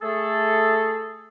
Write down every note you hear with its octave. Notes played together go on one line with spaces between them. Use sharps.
A3 G#4 A4